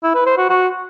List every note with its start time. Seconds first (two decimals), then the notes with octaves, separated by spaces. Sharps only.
0.03 E4
0.15 B4
0.26 C5
0.38 F#4
0.49 F#4